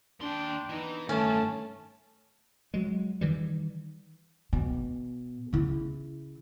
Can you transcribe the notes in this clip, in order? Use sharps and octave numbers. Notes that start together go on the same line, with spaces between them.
D#2 D4 G5 C6
E3 B3 D#4
G2 D#3 A3 C#4 A5
F#3 G#3
D#3 E3 G3
B2
C#3 E4